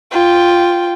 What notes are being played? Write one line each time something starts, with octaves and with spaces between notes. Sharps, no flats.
F4 G5